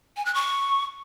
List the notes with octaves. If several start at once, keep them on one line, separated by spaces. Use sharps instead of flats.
G#5
F#6
C#6